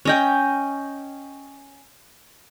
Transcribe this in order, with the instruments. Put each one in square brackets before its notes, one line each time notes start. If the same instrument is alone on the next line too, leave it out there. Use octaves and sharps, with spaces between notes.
[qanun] C#4 D#5 G5